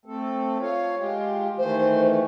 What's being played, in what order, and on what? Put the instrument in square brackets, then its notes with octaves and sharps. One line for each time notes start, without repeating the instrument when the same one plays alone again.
[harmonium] A3 C4 A4
F4 C#5 F5
G#3 F4 G4
[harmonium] D#3 E3 A3 [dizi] C5